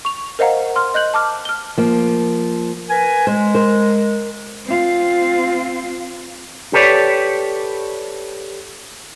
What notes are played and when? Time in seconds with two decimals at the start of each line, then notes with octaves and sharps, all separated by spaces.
0.05 C#6 F7
0.39 A#4 C5 D#5 F5 F#5 A#5
0.76 C6 F6
0.94 D#5 F#6 G6 F#7
1.14 A5 D6 F6
1.45 F6 G7
1.77 F3 A#3
2.89 A#4 B4 G#5
3.27 G#3 C5
3.54 A#4 C5
4.66 C4 F4
6.73 G4 A4 B4 C#5 D5